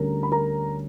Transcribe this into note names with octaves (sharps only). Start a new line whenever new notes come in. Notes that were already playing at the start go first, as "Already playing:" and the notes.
Already playing: D2 D3 G3 C#4 A#4 A#5
B5
A#4 A#5